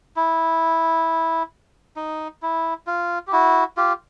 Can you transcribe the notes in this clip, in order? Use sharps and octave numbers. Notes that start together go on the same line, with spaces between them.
E4
D#4
E4
F4
G4
E4 F#4
F4 G4